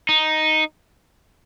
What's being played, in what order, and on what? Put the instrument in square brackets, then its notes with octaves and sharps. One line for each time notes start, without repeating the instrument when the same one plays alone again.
[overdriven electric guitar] D#4